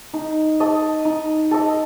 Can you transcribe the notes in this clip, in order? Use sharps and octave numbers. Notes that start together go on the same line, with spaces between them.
D#4
A4 D#5
D#4
A4 D#5